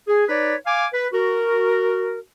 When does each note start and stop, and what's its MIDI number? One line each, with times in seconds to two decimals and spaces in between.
0.08 0.25 68
0.29 0.55 63
0.29 0.55 71
0.29 0.55 73
0.29 0.55 74
0.66 0.87 77
0.66 0.87 80
0.66 0.87 86
0.93 1.07 71
1.13 2.19 66
1.13 2.19 70